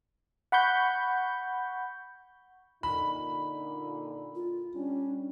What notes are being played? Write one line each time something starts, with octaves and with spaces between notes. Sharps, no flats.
F#5 B5 C#6 G6
A#2 D3 D#4 B5
F4
G3 C#4 D4